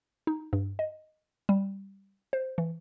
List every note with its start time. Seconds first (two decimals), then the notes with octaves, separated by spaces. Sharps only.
0.27 D#4
0.53 G2
0.79 D#5
1.49 G3
2.33 C5
2.58 E3